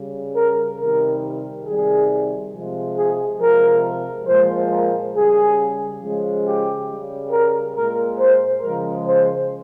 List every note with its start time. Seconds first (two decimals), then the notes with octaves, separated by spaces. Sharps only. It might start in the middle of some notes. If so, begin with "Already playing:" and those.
Already playing: C#3 G3
0.35 A#4
0.78 C3 D#3 G3 A#4
1.65 C3 D#3 G3 G#4
2.52 C3 F3 G#3
2.96 G#4
3.39 C3 F3 G#3 A#4
4.26 A#2 F3 G#3 C5
4.70 A#4
5.14 C#3 G3 G#4
6.01 C#3 F3 G#3
6.45 G4
6.88 C#3 G3
7.31 A#4
7.75 A#2 G#3 A#4
8.19 C5
8.62 C#3 F3 G#3 A#4
9.06 C5